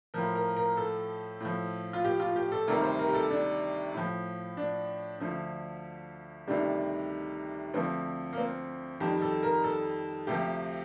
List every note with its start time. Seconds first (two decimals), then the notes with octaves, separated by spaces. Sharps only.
0.14 A2 F3 A#4
0.35 A#4
0.56 A#4
0.77 A4
1.41 A2 F3
1.93 F4
2.05 G4
2.20 F4
2.36 G4
2.52 A4
2.67 D2 C3 D#3 G3 A#4
2.83 C5
2.99 A#4
3.09 G4
3.15 A4
3.31 D4
3.94 A2 F3
4.57 D4
5.21 D2 D3 F3
6.47 D2 C3 D#3 G3 D4
7.74 D2 D3 F3 C4
8.33 A#3
8.37 C4
9.00 F2 D#3 G3 G4
9.22 A4
9.43 A#4
9.64 A4
10.27 D2 C3 F3 G4